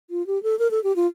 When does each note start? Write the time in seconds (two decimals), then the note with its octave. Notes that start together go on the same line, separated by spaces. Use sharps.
0.10 F4
0.27 G4
0.43 A4
0.59 A#4
0.71 A4
0.84 G4
0.96 F4